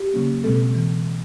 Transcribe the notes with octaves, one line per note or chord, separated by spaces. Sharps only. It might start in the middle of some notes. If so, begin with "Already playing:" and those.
Already playing: G4
C#3 F#3 A#3 C#4
B2 G#3 C4 A4
E3